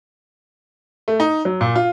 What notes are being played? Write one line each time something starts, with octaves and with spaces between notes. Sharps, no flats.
A3
D#4
F#3
A#2
F4